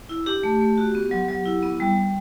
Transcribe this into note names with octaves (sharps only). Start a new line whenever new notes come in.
E4
D4 G4
A3
A3
F#4
B3
F#3
F#3
E4
B3
G3
G3